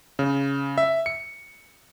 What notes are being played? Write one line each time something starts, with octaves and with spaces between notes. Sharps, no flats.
C#3
E5
C#7